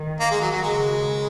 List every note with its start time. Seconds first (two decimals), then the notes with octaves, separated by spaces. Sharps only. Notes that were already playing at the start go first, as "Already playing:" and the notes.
Already playing: D#3
0.19 A#3
0.30 G#3
0.41 F#3
0.51 F#3
0.62 C#3 G#3